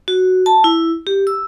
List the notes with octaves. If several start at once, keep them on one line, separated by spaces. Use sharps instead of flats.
F#4
A5
E4
G4
E6